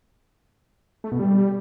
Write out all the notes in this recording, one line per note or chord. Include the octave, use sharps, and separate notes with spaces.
A3
B2
G3